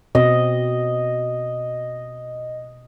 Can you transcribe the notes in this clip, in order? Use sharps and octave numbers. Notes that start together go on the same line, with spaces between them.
B2 C4 D#5